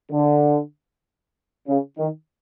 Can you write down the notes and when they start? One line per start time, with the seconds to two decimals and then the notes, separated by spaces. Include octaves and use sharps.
0.11 D3
1.68 C#3
1.98 D#3